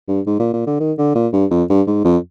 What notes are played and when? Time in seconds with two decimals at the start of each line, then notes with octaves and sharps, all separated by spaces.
0.08 G2
0.27 G#2
0.39 A#2
0.53 A#2
0.67 D3
0.80 D#3
0.98 D3
1.15 A#2
1.33 G2
1.51 F2
1.70 G2
1.87 G#2
2.05 F2